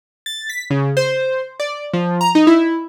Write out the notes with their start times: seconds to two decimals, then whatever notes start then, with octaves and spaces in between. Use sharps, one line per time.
0.26 A6
0.50 B6
0.70 C#3
0.97 C5
1.60 D5
1.93 F3
2.21 A#5
2.35 D#4
2.47 E4